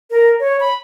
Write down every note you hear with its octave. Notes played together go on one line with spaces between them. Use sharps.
A#4
C#5
B5